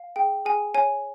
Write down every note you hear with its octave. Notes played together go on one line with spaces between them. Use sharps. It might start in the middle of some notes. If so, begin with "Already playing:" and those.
Already playing: F5
G#4 G5
G#4 G#5
C#5 G#5